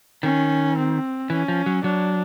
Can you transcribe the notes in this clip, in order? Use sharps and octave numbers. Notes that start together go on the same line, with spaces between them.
D#3 C#4
C4
E3 C#4
F3
F#3
F#3 D4